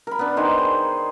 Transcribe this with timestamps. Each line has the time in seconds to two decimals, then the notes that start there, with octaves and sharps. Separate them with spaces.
0.07 A#4 B5
0.19 B3 D4
0.37 D#3 D#4 C5 G#5
0.59 G#4